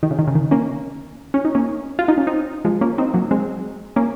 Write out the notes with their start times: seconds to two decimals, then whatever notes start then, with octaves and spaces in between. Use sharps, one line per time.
0.03 D#3
0.11 C#3
0.19 D#3
0.27 C#3
0.35 D#3
0.51 A#3 C#4
1.34 C#4
1.45 D#4
1.55 A#3 C#4
1.99 F4
2.08 D#4
2.18 C#4
2.27 C4 D#4
2.65 F3 G#3
2.81 A#3 C#4
2.98 C4 D#4
3.14 F#3 A#3
3.31 G#3 C4
3.96 A#3 C#4